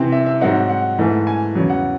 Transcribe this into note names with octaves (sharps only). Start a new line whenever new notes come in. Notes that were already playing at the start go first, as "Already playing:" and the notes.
Already playing: C3 E3 C4
E5
E5
G#2 F#3 C4 D#4 F#5
F#5
G#2 E3 A3
G#5
E2 C#3 F#3
F#5